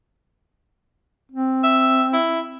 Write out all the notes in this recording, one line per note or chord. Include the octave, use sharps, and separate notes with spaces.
C4
E5
E4